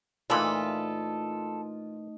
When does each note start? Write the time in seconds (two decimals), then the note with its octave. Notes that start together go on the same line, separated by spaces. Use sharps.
0.30 A#2 E3 A3 D#4 F4 A4 D#5 B5